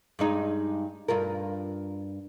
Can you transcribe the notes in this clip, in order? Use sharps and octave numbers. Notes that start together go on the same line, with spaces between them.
G2 G#3 D#4
G2 F4 A#4